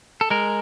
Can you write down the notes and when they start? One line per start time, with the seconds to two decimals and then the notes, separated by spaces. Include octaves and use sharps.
0.21 A4
0.30 G#3 A#4